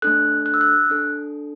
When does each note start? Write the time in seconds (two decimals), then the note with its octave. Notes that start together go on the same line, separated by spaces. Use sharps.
0.02 A3 D4 A4 F#6
0.46 F#6
0.54 E6
0.61 F#6
0.90 D4 A4